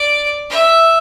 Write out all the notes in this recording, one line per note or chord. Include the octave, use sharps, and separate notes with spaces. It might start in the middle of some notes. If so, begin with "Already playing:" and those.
Already playing: D5
E5